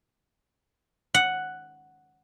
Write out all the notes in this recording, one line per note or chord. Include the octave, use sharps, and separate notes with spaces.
F#5